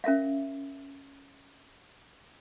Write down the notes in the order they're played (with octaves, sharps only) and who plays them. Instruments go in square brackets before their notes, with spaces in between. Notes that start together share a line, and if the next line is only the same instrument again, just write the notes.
[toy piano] C#4 A#4 E5 F5